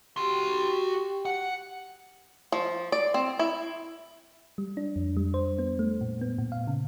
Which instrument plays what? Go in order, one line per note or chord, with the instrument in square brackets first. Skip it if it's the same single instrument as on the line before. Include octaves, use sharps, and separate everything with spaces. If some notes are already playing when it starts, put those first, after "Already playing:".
[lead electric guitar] F#4 C6 [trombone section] G4
[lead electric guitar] F#5
[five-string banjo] F3
D5
C4
E4
[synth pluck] G3
D4
F2
G3
C5
B3
A3
A#2
B3
A#2
F5
C#3